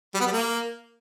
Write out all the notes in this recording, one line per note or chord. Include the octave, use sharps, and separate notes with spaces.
G3
B3
G3
A#3